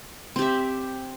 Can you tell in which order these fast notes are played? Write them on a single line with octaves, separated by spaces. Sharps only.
C4 G4 E5